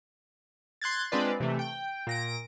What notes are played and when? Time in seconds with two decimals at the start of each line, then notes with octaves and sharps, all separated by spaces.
0.82 C6 F#6 G#6 A6
1.12 G#3 C4 D4 F4 B4 D5
1.40 C3 E3 A3
1.59 G5
2.07 A#2 A#6 D7